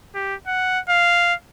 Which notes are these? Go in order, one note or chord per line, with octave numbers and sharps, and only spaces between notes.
G4
F#5
F5